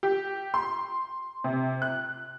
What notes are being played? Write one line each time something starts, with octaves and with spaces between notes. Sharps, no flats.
G4
C6
C3
F#6